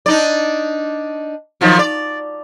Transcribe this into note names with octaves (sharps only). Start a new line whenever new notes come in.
D4 D#4 D5
D#3 F3 F#3
D5